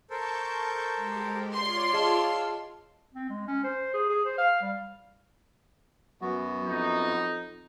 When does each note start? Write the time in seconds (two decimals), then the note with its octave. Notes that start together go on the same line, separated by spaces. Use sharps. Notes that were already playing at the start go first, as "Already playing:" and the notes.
0.10 A4 A#4 C5 A5 C#6 G6
0.95 G#3 G4
1.53 F4 C#5 D5 C6
1.93 G#4 D#5 F5 A5 E6
3.14 C4
3.29 G#3
3.47 C#4
3.64 C5
3.94 G#4
4.09 G#4
4.25 C5
4.38 F5
4.61 G3
6.21 F#2 F#3 B3 F#4
6.65 F2 D#4